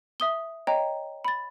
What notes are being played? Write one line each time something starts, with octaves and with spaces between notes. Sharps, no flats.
E5 D#6 G7
C#5 D#5 G5 A#5
B5 A6